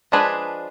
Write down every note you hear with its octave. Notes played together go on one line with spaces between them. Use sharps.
F3 G#3 D4 G#4 B4